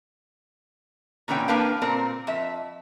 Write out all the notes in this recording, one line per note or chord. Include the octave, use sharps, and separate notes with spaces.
A#2 D3 E3 C#4 G5
A#3 D4 A#4 B4 F5 G5
A#2 C4 A#4
F2 E5